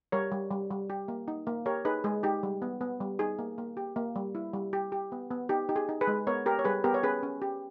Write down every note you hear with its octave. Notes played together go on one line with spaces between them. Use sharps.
G3 A#4 C#5
G3
G3
G3
G4
A#3
D#4
A#3
G4 A#4 C#5
D#4 G#4 B4
G#3 G#4
D#4 G4
G3
B3
B3
G3
D#4 G#4
A#3
A#3
G4
A#3
G3
E4
G3
G4
G4
B3
B3
D#4 G4
D#4 G4
G#4
D#4
G#4 B4
G#3
B3 A#4 C#5
G4 A#4
C#5
G3 G#4 B4
B3 G4 A#4
C#5
C#4 G#4 B4
C#4
G4